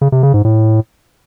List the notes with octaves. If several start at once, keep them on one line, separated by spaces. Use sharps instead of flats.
C#3
C3
C#3
G#2
A2